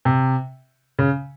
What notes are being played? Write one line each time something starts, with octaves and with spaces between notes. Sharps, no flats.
C3
C#3